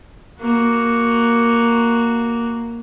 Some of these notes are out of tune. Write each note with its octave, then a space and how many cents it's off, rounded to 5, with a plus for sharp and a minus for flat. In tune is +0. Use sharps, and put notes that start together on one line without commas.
A#3 +0 F#4 +0